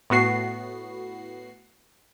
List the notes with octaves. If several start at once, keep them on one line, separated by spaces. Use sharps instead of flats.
A2 B3 F#4 C7